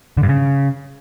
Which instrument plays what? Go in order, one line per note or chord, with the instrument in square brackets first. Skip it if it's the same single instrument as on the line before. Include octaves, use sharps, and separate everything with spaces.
[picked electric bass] D3
G2
C#3